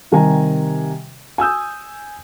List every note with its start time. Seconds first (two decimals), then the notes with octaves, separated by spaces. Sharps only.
0.12 C3 D#3 G3 G#5 A#5
1.38 G#5 D#6 E6 G6